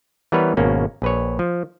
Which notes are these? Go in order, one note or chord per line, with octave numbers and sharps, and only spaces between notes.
E3 G3 B3 A#4 B4 C#5
G#1 B2 A#3 C#4
A#1 B4 C#5
F3